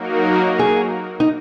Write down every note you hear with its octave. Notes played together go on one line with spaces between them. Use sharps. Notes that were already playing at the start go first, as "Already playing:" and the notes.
Already playing: F#3 A#3 D#4 F#4 A#4
G#4
D#4